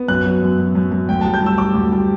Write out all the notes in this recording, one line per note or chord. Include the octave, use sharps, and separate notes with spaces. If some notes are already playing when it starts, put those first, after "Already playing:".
Already playing: B3
F#2 F#6
F#3
F#2
F#2
F#2
F#2
D2 G5
A5
G3
G6
G3 E6
G3 D6
D2
G3